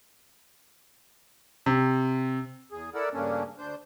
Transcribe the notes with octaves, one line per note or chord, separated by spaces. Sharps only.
C3
E2 G#4
E4 A4 A#4 D5 F#5 E6
G2 C#3 A3 A#3 C#4 D4
D2 D4 C5 G6